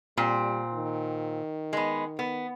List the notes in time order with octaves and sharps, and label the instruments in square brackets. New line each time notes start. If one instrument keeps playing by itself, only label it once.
[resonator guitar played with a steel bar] A#2 C4 [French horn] G3
[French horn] D#3
[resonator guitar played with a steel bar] G#3 B3
B3